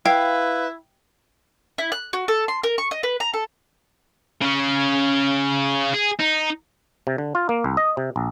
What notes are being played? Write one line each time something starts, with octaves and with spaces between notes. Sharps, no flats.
E4 B4 F5 G5
E4
F#6
F#4
A4
C6
A#4
C#6
D#5
B4
A#5
A4
C#3 C#4
G#4
D#4
C3
D3
F4
A#3
C2
D#5
C3
A#1